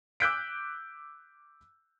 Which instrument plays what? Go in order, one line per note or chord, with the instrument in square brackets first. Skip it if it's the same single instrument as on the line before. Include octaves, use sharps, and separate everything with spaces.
[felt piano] D6 E6 F#6 G6 B6 D7